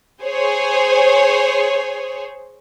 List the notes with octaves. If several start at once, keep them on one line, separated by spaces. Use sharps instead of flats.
G#4 C5 C#5